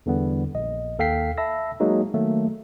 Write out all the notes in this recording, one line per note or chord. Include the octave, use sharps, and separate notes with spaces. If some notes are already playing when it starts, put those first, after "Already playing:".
E2 D3 G3 B3
A#1 D#5
D#2 A4 F5 G5 B6 C7
E5 A5 B5 E6 A#6
F#3 G#3 A#3 D#4
D#3 F#3 A3 A#3